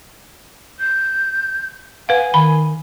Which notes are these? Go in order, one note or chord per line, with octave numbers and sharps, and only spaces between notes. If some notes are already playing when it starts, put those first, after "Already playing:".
G6
B4 F5 F#5 G#5
D#3 B5